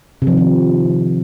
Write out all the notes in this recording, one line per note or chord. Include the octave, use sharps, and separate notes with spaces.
C3
F3
D#3
F3